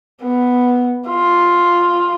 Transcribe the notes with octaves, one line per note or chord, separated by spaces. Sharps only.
B3
F4